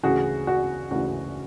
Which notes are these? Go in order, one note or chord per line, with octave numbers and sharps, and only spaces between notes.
D2 C#3 E3 F#4 G#4
F#4
D2 C#3 E3 F#4